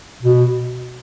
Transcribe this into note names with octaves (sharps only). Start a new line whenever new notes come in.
B2